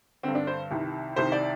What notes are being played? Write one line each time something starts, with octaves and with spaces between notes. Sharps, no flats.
G2 D3 C4
D4
C5
C2 C3 D#3
C2 C3 D#3 C5
D5